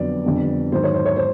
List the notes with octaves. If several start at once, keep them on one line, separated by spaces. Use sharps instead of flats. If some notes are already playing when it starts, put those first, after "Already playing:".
Already playing: F2 D3 F#3 B3 D5
F2 D3 G3 B3
G#2 D#3 F#3 C5
C#5
C5
C#5
C5